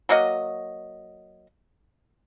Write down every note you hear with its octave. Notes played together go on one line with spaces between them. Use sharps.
F#3 A#3 F#4 D#5